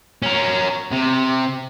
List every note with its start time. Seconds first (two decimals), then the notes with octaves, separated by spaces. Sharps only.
0.23 C#4 A#4
0.91 C3